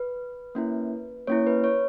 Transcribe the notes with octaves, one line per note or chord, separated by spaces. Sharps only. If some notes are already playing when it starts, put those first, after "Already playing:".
Already playing: B4
A#3 C#4 E4
A#3 C#4 E4 C#5
B4
C#5